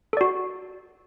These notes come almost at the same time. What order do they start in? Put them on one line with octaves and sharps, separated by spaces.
A4 D5 F#4